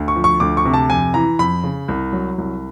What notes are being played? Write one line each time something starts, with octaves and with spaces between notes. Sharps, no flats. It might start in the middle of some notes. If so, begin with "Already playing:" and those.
Already playing: D2
C#6
F3
C#6
D2 D6
C#6
C3
A5
F2 G#5
E3 A#5
F2 B5
C#3
C2
F#3
C2